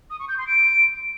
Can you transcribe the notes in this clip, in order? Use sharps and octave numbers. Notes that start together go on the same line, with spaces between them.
D#6
C#6
G6
C6
D7